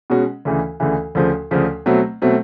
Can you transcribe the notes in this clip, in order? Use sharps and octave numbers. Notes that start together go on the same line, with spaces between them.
B2 G#3 C#4 F#4
D2 C#3 E3
D2 C#3 E3
D2 C#3 F3
D2 C#3 F3
B2 F#3 A3 C4
B2 F#3 A3 C4